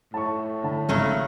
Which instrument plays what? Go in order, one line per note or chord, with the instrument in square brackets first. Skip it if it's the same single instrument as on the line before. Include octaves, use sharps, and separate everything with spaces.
[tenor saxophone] A2 [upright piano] A5 C#6
[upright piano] D3 A5
[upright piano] G#1 [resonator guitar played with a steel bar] C#3 F#3 A3